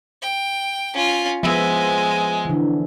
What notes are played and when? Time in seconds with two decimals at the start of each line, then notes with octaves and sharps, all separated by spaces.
0.22 G5
0.94 C#4 F4
1.43 F3 G#3 B3 E5
2.45 D3 E3